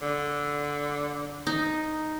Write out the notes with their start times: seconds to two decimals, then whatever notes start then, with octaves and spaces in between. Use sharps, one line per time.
0.02 D3
1.47 D#4